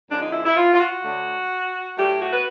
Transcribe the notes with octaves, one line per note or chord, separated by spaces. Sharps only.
F#2 D3 F3 G#3 D4
D#4
E4
E4
F4
F4
F#4
D2 D3 F#3 A3
A2 F#3 A3 G4
F#4
B4